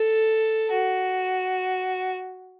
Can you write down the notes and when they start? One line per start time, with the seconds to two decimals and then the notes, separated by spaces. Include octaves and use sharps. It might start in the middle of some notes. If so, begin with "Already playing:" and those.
Already playing: A4
0.72 F#4